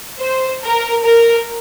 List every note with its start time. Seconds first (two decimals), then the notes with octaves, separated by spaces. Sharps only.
0.20 C5
0.63 A#4
1.05 A#4